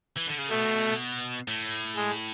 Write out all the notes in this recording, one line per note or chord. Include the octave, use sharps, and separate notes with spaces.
E3
D3
C#3
B2 A3
A2
G#3